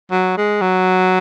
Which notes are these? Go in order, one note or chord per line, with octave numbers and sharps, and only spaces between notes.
F#3
G#3
F#3